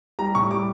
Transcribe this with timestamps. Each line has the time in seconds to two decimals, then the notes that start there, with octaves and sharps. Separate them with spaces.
0.19 G3 A#5
0.35 A2 C#6
0.51 G3 D6